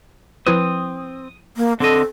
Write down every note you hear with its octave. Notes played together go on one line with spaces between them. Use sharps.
F3 C4 E4 B4 D#6
A#3
D3 C4 A4 D#5